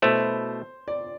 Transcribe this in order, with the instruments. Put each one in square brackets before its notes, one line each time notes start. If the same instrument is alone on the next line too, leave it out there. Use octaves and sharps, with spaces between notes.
[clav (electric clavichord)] B2 A3 E4 [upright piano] C5
[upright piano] D5